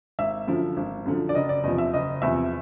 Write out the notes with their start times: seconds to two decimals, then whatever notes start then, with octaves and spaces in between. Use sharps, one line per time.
0.19 G#1 E5
0.47 F#2 D3 F3
0.77 G#1
1.06 F#2 D3 F3
1.29 D5
1.35 F#1 D#5
1.49 D5
1.64 E2 C3 F3 D#5
1.78 E5
1.94 F#1 D#5
2.22 E2 C3 F3 E5